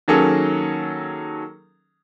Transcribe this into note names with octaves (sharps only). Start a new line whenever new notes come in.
D#3 F#3 A#3 C#4 G#4 A4